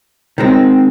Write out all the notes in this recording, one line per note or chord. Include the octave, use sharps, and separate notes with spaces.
D#3 G#3 C4